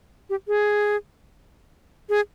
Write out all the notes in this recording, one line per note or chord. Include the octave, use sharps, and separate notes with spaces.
G4
G#4
G#4